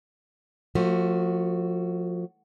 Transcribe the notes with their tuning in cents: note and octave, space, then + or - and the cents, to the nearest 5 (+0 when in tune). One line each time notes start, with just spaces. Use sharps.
F3 +25 A3 +40 F#4 +5